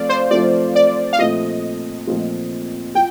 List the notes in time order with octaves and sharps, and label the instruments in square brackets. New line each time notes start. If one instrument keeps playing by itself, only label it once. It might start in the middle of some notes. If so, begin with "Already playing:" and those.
Already playing: [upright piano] F3 A3 C4 F4 [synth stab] D5 F5
[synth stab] C5
[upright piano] F3 A3 C4 F4 [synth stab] D5
[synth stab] D5
F5
[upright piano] A#2 F3 A3 C4 F4 [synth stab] D#5
[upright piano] A#2 F3 A3 C4 F4
[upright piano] F4 [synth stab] G5